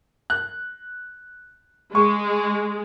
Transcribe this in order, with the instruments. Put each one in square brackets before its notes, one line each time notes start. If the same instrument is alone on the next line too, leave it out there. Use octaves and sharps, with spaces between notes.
[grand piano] F#6
[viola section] G#3 [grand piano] C#6